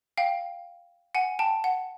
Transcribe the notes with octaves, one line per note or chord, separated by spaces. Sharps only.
F5 G5
F#5 G#5
G5 A5
F#5